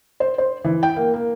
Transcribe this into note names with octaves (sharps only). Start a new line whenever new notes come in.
C5
C5
E3
G5
A#3
A#3